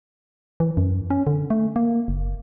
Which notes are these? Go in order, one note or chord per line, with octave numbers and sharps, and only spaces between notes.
E3
F#2
C#4
D3
A3
A#3
F#1